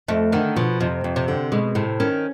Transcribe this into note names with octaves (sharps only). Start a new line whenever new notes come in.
F2 A3
D3 D#3
B2 F3
F2 C3
F2
C3
D3
B2 G#3
A2 C3
D#3 C#4